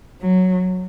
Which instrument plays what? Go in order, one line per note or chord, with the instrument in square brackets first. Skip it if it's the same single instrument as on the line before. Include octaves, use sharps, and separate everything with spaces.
[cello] F#3